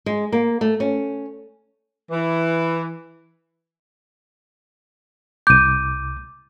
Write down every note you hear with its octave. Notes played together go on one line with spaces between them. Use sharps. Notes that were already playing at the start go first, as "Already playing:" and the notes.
G#3
A#3
A3
C#4
E3
C2 D6 G6 D#7